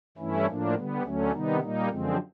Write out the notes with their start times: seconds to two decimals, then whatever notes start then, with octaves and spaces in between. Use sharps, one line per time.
0.17 G2 E3 A3 C#4 E4
0.47 A2 F3 A#3 D4
0.75 D3 G3 B3
1.03 D2 D3 F#3 A3 C#4
1.32 C3 D#3 G3 B3 D#4
1.60 A#2 G3 A#3 D#4
1.89 F#2 D3 F3 G#3 C4